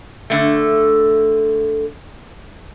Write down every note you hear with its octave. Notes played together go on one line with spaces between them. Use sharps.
D3 A3